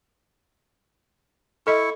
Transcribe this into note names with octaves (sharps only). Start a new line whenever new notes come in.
E4 A4 D#5 C#6